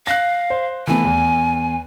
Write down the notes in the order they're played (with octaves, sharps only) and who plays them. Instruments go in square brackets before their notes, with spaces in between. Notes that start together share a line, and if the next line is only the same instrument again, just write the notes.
[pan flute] F5 [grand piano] F#6 A#6
[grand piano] C5
[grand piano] E3 A3 B3 [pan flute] G#5
[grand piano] E2